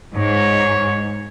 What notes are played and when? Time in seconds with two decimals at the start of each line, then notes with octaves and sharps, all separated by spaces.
0.15 G#2 C#5